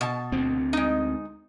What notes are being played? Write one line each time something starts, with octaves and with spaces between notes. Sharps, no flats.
B2 A5
D2 C4
G#3 D#4